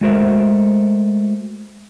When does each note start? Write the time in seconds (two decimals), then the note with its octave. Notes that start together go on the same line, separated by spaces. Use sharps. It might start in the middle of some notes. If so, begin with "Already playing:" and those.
0.01 G#3 A3 F#4 A#4 C5 E5